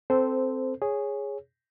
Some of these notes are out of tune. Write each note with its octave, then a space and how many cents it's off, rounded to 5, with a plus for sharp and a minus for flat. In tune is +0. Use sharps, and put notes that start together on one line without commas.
C4 +0 A4 +0 C5 -15
G#4 -5 C#5 +0